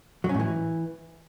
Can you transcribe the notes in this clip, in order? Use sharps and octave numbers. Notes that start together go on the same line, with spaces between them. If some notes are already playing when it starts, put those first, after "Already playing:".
F#3
C#4
A2
E3